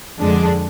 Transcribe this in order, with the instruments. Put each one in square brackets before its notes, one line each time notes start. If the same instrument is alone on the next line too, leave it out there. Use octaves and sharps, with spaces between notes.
[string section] F2 D3 G#3 D4